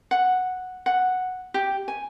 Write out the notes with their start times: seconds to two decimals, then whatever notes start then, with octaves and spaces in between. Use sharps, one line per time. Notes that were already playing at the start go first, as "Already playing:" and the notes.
0.11 F#5
0.86 F#5
1.54 G4
1.88 G#5